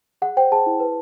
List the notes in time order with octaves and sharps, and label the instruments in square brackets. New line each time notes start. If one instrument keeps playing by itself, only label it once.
[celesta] G#4 F#5
C5 G5
G#4 A5
E4
B4